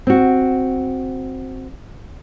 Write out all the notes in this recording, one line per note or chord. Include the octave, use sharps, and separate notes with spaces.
C4 F#4